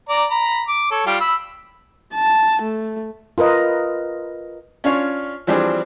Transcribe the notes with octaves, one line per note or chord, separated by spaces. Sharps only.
D5 A#5
A#5 B5
D6
A4 C#5
G3 F4 G5
B5 E6
A5
A3
F4 A#4 B4 D#5
C#4 D4 F4 C#5
E3 F3 G3 C4 D4 G#4